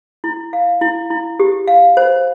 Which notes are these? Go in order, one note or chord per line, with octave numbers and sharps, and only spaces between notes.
E4
F5
E4
E4
G4
F5
C5